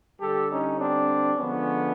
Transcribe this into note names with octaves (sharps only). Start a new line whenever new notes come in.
D3 G3 G4 A4
C#4 D#4
C4 D4
D3 F3 G#3 B3 C#4